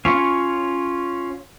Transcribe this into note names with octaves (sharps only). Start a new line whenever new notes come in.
C#4 F4 C#5